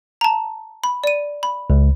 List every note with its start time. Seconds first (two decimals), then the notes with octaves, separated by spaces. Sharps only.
0.21 A5 A#5
0.84 B5
1.04 D5 D#7
1.43 B5
1.70 C#2